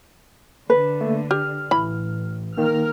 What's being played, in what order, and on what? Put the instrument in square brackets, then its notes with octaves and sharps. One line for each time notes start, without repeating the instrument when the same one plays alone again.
[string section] D3 [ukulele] B4
[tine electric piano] A3 A#3
[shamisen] G4 [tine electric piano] F6
[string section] A1 [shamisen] E3 B5
[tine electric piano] D#3 A#3 [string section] A#4 F6